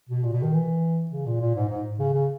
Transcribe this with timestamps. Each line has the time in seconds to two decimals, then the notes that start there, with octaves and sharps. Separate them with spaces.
0.09 B2
0.24 A#2
0.33 B2
0.43 D#3
0.53 E3
1.11 C#3
1.26 A#2
1.41 A#2
1.55 G#2
1.70 G#2
1.99 C#3
2.13 C#3